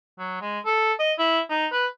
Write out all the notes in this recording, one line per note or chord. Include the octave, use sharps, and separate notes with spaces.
F#3
G#3
A4
D#5
E4
D#4
B4